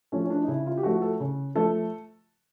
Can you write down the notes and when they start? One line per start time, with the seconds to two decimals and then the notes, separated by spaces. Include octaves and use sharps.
0.12 F3 A3 C#4
0.24 C#4
0.30 D4
0.43 D#4
0.48 C#3 E4
0.66 F4
0.77 G4
0.83 F3 A3 F#4
1.02 A4
1.20 C#3
1.55 F3 A3 A4